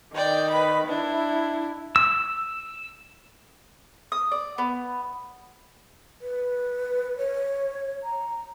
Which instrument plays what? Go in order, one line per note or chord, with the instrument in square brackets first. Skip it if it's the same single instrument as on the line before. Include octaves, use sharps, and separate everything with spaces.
[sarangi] D#3 [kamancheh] D5 G5
[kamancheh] B4 B5
[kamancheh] D4 [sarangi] E4
[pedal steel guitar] E6
[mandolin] D#6
D5
B3
[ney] B4
C#5
A#5